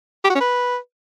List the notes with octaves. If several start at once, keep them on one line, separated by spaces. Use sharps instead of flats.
G4
F#4
C#4
B4